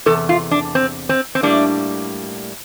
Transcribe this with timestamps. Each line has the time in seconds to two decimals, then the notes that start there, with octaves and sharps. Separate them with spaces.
0.06 E2 C3 A4
0.29 F4
0.51 D4
0.75 C4
1.09 C4
1.35 C4
1.42 A2 G3 A#3 D4